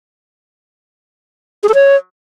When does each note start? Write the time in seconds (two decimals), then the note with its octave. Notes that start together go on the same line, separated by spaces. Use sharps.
1.63 G#4
1.69 A4
1.74 C#5